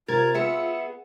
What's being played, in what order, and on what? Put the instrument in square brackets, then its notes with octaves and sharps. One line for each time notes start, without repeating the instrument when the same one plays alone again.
[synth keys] C3 G#6 A6 [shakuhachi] F4 [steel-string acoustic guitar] A#4
[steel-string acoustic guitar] B3 G#4 [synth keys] E5 C#7 E7